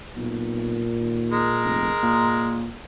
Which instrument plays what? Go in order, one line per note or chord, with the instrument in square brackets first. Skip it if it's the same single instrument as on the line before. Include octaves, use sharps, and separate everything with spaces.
[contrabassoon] B1 [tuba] A#2
[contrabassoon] D#2
[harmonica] G#3 A#4
[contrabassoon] F1
A#2